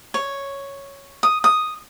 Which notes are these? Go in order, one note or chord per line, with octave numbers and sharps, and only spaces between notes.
C#5
D#6
D#6